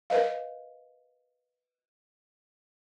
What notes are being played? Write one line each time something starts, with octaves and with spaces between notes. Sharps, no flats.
A#4 B4 D#5 F5